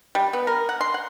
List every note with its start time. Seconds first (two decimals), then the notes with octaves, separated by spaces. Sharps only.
0.15 G3
0.33 B3
0.47 A#4
0.69 F#5
0.81 C6
0.94 F#5